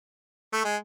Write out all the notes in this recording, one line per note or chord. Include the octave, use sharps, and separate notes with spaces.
A3
G#3